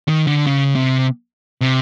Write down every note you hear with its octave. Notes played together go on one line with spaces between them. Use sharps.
D#3
D3
C#3
C3
C3